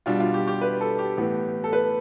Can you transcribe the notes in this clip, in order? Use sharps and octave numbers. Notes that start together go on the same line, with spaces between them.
B2 G3 D4 F4
F4
G4
G4
B4
A4
G4
A2 E3 B3
A4
B4